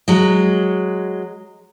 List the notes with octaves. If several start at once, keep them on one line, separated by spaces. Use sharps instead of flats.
F#3 G#3